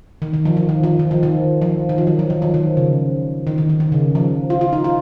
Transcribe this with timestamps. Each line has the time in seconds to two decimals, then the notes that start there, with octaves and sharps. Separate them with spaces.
0.22 D#3
0.34 D#3
0.45 F3
0.57 F3
0.69 D#3
0.84 F3
0.99 D#3
1.11 F3
1.23 D#3
1.62 F3
1.89 D#3
1.98 F3
2.07 F#3
2.19 F3
2.30 D#3
2.42 F3
2.54 D#3
2.77 C#3
3.47 D#3
3.58 D#3
3.69 D#3
3.80 D#3
3.92 C#3
4.15 F3
4.50 F4
4.61 F4
4.73 D#4
4.84 F4